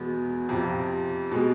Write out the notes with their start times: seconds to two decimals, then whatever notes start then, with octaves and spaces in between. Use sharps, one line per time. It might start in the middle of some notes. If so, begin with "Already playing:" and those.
Already playing: E2 B2 G#3 B3
0.49 F2 C3 F3
1.32 B2 G#3